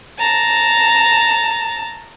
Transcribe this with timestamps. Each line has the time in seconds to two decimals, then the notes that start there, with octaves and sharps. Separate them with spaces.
0.19 A5 A#5